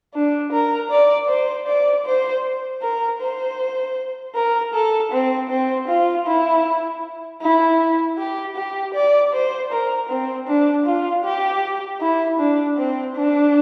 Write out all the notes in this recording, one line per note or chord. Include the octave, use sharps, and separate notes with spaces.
D4
A#4
D5
C5
D5
C5
A#4
C5
A#4
A4
C4
C4
F4
E4
E4
G4
G4
D5
C5
A#4
C4
D4
F4
G4
E4
D4
C4
D4